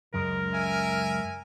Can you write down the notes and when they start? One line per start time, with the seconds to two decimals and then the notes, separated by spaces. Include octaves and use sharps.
0.14 C#2 F#2 G#3 A#4
0.53 E5 G#5